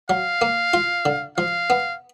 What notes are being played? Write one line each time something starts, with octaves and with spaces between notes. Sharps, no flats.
F#3 F5
A#3
F4
D3
F3 F5
B3